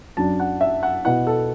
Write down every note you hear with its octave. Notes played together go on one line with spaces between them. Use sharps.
F#2 F#3 D4 A5
F#5
E5
F#5
B2 B3 E4 F#5
A4